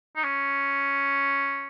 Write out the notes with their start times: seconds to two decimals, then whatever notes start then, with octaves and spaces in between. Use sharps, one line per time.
0.16 D#4
0.24 C#4